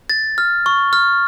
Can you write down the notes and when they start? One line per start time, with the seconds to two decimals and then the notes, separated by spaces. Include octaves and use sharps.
0.10 A6
0.38 F6
0.66 C#6
0.93 F6